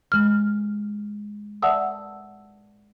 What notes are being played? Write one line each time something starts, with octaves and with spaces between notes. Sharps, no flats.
G#3 F6
D5 E5 F#5 A5 D#6 E6